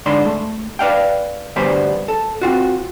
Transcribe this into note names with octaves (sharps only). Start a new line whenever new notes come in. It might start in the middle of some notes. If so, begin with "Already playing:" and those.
G#2 D3 D5 B5 C6
A3
B4 D5 F5 G5
D2 G2 G3 B3 C5 B5
A4
C4 F4 F#4